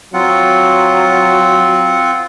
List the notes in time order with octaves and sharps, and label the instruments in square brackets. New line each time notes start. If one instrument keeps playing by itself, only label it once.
[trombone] F#3 [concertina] C4 F4 F#5